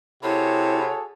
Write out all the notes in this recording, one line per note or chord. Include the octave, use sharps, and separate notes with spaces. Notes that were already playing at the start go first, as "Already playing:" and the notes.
C3 E4 F#4 G#4 A4 C#5